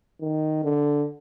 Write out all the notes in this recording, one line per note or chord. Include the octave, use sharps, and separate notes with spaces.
D#3
D3